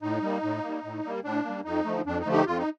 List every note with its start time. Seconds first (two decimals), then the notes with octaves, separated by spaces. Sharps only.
0.02 A2 D#4
0.22 G3 A#3
0.43 A2
0.63 G3 A#3
0.84 A2
1.04 G3 A#3
1.24 A2 D4
1.45 G3 A#3
1.64 F2 D#4
1.85 D3 F3 A3
2.06 F2 D4
2.20 D#4
2.26 D3 F3 A3
2.32 D#4 G4
2.46 F2 F4
2.58 D#4